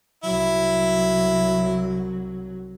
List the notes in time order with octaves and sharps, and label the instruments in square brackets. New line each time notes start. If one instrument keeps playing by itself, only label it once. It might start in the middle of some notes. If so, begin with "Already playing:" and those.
[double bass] C2 F#3 [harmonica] E4